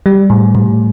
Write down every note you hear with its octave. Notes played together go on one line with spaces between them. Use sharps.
G3
A2
A2